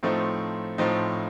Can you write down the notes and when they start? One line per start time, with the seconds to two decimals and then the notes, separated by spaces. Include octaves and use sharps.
0.03 A2 F3 A3 C4 D#4
0.78 A2 F3 A3 C4 D#4